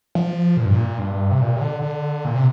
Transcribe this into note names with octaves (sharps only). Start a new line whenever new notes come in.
F3
A#2
G2
A#2
G2
C3
A#2
C3
D3
D3
A#2
C3